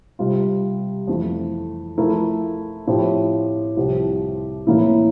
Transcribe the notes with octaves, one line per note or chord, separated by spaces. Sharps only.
C3 G3 C4 F4
F2 E3 A3
F3 A3 E4 A#4
A2 F3 C4 G4
C2 C3 F3 C4 G4
A2 E3 A#3 E4